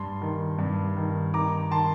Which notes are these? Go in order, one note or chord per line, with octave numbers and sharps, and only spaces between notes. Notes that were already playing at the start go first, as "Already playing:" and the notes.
Already playing: G2 A5 C6
D#3
G2
D#3
D#3 A#5 D6
D#3 A5 C6